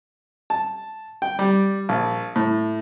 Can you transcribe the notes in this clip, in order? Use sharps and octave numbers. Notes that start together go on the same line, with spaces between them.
A5
G5
G3
A#1
A2